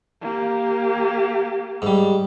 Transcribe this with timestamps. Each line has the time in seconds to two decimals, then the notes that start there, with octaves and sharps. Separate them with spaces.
0.21 A#3 G4
1.82 G#2 G3